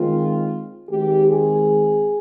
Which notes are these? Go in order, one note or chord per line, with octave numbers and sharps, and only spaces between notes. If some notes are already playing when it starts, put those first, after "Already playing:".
Already playing: D#3 G#3 C4 F4
D#3 G#3 C4 G4
G#4